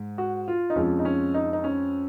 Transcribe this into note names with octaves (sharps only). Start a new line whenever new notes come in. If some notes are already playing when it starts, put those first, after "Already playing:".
Already playing: G#2
F#4
F4
D#4
F2 F3 G#3 C#4
D#4
C#4
D#4
D#4
C#4